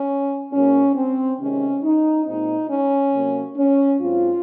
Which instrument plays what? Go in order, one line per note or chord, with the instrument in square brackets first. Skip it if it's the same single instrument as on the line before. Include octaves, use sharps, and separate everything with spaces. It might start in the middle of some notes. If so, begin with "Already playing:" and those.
Already playing: [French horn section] C#4
G#2 F#3 A#3 C#4
C4
C3 D#3 G#3 C#4
D#4
A#2 G#3 C4 D#4
C#4
C3 F#3 A#3
C#4
G#2 F#3 C4 F4